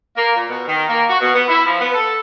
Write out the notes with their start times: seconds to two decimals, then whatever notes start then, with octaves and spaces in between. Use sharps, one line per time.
0.15 A#3
0.36 A#2
0.49 B2
0.67 D#3
0.89 A#3
1.08 F#4
1.21 B2
1.34 B3
1.48 E4
1.66 F3
1.80 B3
1.94 A4